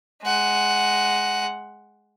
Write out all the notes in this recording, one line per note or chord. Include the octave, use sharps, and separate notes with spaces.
G#3 F#5